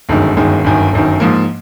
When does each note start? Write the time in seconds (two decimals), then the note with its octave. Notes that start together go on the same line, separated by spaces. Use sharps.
0.09 G1 F#2 D#3 G#3
0.36 G1 F#2 D#3 G#3
0.64 G1 F#2 D#3
0.92 G1 F#2 D#3
1.20 G#2 F3 A#3